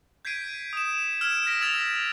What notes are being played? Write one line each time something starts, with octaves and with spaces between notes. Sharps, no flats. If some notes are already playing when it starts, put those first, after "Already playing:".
G6 G#6 B6 C7 D7 D#7
D#6 E7
E6 F6 G#6 E7
F6 A#6 B6 D7 E7
E6 G#6 A6 F7